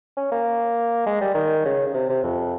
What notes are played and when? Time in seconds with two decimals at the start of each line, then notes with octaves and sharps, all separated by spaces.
0.17 C#4
0.32 A#3
1.06 G#3
1.21 G3
1.35 D#3
1.65 C#3
1.87 C#3
1.94 C3
2.10 C3
2.24 F2